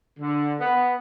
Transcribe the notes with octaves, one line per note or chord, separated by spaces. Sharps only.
D3
B3